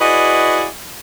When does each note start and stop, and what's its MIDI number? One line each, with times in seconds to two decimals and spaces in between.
0.01 0.65 64
0.01 0.65 66
0.01 0.65 68
0.01 0.65 71
0.01 0.65 74
0.01 0.65 75